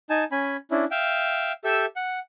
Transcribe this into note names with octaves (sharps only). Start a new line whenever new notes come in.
D#4 G#5 A5
C#4 G#5 B5
C#4 D4 E4
E5 F5 G5
G4 A4 E5 E6
F#5